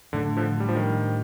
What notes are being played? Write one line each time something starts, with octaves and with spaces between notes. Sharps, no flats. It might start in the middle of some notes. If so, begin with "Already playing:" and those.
A2 D3 A3 D4
D3 F3
G3
F3
D#3 G3